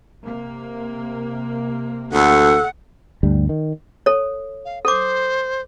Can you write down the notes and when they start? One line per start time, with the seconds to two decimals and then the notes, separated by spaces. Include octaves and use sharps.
0.24 C3 A#3
2.13 D2 A4 F#5
3.23 D2 G2 G3
3.49 D#3
4.06 A4 C#5
4.65 F5
4.85 A4 C5 D6